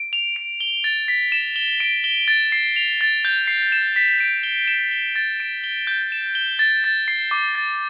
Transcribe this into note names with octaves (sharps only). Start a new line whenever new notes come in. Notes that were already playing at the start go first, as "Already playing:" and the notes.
Already playing: D7
F7
D7
G7
A6
B6
E7
G7
D7
G7
A6
C7
F7
A6
G6
C7
E7
B6
D7
G7
E7
G7
A6
D7
G7
G6
E7
G7
A6
A6
C7
D6
A6